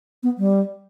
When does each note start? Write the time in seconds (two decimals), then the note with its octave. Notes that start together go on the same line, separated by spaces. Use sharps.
0.23 B3
0.38 G3